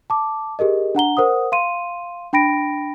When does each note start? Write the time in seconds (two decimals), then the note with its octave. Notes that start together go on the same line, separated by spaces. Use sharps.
0.10 A5 D6
0.59 G4 G#4 A#4 D#5
0.95 D4 F#5 A#5 G7
1.17 A#4 C5 F#5 D#6
1.52 F5 C6 D#7
2.33 D4 G5 B5 A#6 D7